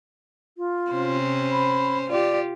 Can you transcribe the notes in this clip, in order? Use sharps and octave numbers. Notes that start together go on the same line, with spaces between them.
F4
C3 C#4 C5
B5
F4 G4 D5